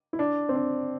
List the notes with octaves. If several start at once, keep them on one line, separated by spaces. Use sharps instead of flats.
E4
D4
C4
D4